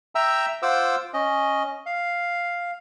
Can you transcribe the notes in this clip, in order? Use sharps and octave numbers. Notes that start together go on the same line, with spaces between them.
E5 G5 A#5 E6
F4 C5 F#5 D6 E6
C#4 D#5
F5